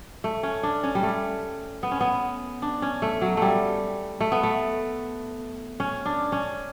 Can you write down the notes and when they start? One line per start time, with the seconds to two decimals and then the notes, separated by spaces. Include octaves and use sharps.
0.24 A3
0.43 C#4
0.63 D4
0.83 C#4
0.95 G3
1.03 A3
1.83 B3
1.91 C#4
2.01 B3
2.62 D4
2.82 C#4
3.02 A3
3.22 F#3
3.37 G3 A3
4.21 A3
4.32 B3
4.43 A3
5.80 C#4
6.06 D4
6.32 C#4